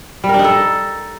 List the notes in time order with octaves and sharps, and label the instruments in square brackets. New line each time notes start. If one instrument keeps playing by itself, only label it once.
[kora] G3
A#4
D4
D#4
A4